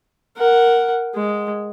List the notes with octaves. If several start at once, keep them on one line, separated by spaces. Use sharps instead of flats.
A#4 F#5
G#3